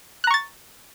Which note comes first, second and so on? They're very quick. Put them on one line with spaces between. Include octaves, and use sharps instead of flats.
F#6 A#5 C#6 A6